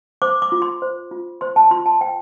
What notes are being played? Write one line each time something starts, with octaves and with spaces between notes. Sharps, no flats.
C5 D6
D6
F4
C6
C5
F4
C5 C6
A5
F4 C6
A5
C5 G5